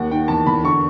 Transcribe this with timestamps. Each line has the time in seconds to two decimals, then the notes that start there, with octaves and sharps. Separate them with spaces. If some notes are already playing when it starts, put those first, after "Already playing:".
Already playing: D#2 F#5
0.11 D#3 G5
0.28 E2 A5
0.46 E2 B5
0.63 D3 C#6